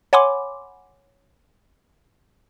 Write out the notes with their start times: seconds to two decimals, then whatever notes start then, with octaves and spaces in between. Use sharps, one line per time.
0.13 C#5 F#5 G#5 B5 C6 D6